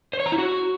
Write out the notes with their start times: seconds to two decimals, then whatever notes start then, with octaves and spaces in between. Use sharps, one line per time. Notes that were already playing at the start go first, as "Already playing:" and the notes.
0.13 C5
0.20 C#5
0.26 A#5
0.32 E4
0.38 F#4